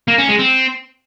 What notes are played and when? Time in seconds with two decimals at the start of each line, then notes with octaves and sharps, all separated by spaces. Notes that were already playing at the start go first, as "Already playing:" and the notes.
0.08 A#3
0.18 C#4
0.29 G#3
0.39 C4